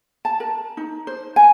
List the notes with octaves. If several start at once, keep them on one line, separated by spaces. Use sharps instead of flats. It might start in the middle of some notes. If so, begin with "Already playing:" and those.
A5
A#4
D#4
C5
G#5